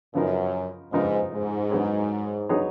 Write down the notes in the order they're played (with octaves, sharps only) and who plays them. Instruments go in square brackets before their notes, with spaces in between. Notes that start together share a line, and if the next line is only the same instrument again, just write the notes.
[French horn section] F#2 [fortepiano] C#3 F3 B3 D#4 A#4
[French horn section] G#2 [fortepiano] C#3 F3 B3 D#4 A#4
[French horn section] G#2
[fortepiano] F#3 B3 D#4 G#4 C#5
F#3 B3 D#4 G#4 C#5